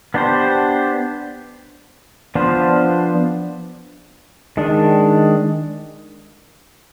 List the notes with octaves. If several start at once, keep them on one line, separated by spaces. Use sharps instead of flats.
B3 D4 G4 C5
F3 B3 D4 F4 C5
D#3 G#3 D4